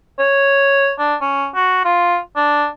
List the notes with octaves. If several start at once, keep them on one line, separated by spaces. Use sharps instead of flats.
C#5
D4
C#4
F#4
F4
D4